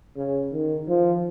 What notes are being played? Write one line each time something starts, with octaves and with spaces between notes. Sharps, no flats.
C#3
D#3
F3